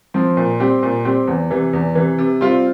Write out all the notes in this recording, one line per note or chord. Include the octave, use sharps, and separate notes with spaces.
F3 C4
A#2
G3 C4 G4
A#2
G3 C4 G4
E2
C3 E3
E2
C3 E3
C3
G3 C4 F4